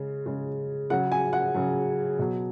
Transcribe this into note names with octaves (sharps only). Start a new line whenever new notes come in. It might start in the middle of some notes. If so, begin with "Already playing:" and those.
Already playing: C#3 G#3
C#3 G#3
C#3 F#3 F#5
G#5
F#5
C#3 F#3
B2 F#3